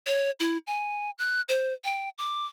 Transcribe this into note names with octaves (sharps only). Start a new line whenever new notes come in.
C#5
E4
G#5
F#6
C5
G5
D6